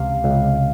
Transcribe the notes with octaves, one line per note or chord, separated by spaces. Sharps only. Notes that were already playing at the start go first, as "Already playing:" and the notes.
Already playing: C#2 C3 F5
C#2